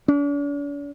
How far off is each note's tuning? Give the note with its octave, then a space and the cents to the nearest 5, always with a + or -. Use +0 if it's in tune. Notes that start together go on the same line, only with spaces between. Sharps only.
D4 -45